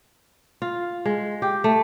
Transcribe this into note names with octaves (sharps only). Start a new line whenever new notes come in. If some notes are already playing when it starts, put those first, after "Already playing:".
F4
G#3
G4
A3